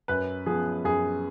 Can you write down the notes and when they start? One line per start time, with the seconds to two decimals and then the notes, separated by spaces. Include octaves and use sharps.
0.08 F#2 B4
0.46 F3 B3 G#4
0.84 F#2 G#4